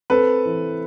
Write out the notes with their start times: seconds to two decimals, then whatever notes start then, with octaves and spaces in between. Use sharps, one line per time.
0.10 C4 A4 B4
0.45 E3